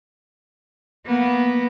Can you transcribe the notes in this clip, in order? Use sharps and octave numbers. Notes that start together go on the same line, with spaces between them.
A#3 B3